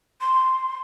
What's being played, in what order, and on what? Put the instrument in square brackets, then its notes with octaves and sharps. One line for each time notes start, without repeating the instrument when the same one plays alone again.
[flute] C6